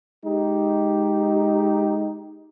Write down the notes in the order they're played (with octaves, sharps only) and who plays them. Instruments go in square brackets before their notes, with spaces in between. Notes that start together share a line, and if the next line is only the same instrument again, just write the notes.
[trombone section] G#3 D#4 G4